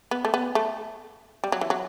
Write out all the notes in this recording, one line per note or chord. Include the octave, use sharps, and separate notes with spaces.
B3
A3
B3
A3
G3
F#3
E3
F#3